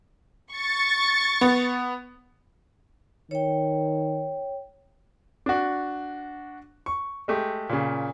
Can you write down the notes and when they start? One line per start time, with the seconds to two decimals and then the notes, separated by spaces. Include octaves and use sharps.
0.53 C#6 A6
1.41 B3
3.31 D#3 C#5 G5
5.46 D4 F#4
6.86 C#6
7.28 G#3 A3 G4
7.69 A#2 C#3